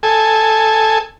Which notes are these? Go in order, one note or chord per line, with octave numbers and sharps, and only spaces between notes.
A4 G#5